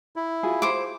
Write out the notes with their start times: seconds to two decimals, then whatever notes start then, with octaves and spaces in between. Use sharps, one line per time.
0.16 E4
0.43 F4 F#4 G#4
0.62 C5 D6